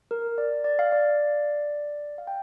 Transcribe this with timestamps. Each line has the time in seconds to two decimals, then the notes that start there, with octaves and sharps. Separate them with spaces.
0.11 A#4
0.38 D5
0.64 D5
0.79 F5
0.92 D5
2.18 F5
2.27 G5